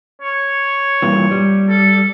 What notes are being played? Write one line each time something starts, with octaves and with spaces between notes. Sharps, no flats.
C#5
G2 A#2 E3
G3
A4